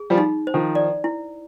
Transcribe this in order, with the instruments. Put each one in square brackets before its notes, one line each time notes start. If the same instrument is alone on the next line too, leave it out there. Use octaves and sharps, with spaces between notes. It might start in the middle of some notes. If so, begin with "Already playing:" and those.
Already playing: [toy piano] G#4
[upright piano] F3 G3
[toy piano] D#4
C5
[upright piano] D#3 F3
[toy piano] D5
E4